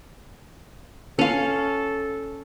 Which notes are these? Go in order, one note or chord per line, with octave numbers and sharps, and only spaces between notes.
C#4 A4 F5